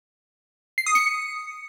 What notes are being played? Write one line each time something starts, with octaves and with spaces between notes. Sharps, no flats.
C7
D#6
C#7